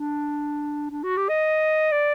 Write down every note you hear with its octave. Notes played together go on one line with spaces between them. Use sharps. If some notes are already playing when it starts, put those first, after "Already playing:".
Already playing: D4
D4
F#4
G4
D#5
D5